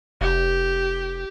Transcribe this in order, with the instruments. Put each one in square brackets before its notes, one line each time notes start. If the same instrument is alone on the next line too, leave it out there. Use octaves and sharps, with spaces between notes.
[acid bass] F1 [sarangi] G4